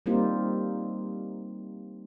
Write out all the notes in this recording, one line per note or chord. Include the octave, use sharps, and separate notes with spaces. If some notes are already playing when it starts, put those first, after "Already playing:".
G3 A#3 C4 D#4 F4 G4